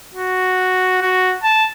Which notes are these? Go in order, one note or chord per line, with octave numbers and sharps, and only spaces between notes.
F#4
F#4
A5